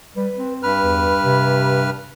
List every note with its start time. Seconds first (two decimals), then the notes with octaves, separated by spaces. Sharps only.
0.16 G3 B4
0.35 C4
0.63 G2 B4 B5 F6
0.81 E2
1.24 C3